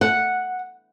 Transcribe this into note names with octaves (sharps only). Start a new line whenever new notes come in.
F#5